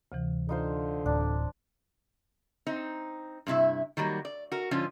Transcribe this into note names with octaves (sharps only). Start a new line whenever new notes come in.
D2 C3 E3
D3 D#4 F4 C5
D1 D4
C4 D#4
G2 C3 E4 E5
D#3 F#3 G3 A#3
D5
F#4 A#4
G#2 D3 F3 C#4 F4